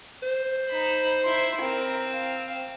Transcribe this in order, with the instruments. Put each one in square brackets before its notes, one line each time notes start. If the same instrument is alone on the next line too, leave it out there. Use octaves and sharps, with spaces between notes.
[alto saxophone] C5
[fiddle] D#4 B5
E4 C6
[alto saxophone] C4 [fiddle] A#4
[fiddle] F5